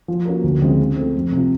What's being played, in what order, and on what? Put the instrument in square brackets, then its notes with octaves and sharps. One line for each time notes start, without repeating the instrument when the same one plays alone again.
[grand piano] F3
A#3 C#4 F#4 A#4
D2
C#3 F3 G#3 C4
F3
A3 C4
F2
C3 F3